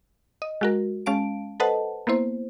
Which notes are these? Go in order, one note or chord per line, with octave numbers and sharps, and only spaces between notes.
D#5
G#3 F#4 A#4
G#3 C#4 F5 A5 D7
A4 B4 C5 D#5 F#5 A5
A#3 B3 E4 C5